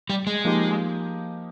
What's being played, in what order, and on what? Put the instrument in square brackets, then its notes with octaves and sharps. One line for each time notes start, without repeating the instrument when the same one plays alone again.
[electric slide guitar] G3
G#3
[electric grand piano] F3 A#3 D#4 G4